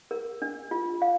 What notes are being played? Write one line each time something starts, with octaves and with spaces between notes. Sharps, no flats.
A#4
D4
F4
F5